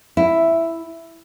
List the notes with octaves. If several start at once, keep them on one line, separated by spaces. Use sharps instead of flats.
E4